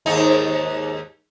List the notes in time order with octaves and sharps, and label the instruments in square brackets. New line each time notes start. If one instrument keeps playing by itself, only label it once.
[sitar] D#2 G#2 D#4